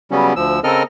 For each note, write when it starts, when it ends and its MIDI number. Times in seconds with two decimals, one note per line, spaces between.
0.11 0.33 49
0.11 0.33 54
0.11 0.33 55
0.11 0.33 59
0.11 0.33 61
0.36 0.60 38
0.36 0.60 53
0.36 0.60 88
0.64 0.83 49
0.64 0.83 60
0.64 0.83 69
0.64 0.83 70
0.64 0.83 75
0.64 0.83 89